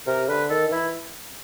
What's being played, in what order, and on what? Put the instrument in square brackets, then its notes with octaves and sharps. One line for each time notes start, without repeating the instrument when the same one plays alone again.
[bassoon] C3 [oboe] A#4
[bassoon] D3 [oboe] B4
[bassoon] D#3 [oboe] A4
[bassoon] D#3
[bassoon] E3 [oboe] E4